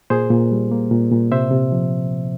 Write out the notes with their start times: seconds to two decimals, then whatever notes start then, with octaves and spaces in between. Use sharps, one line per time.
0.10 A#2 G#4 C5
0.30 A#2
0.52 G3
0.71 A#3
0.91 A#2
1.12 A#2
1.32 C3 C5 E5
1.51 C3
1.72 F3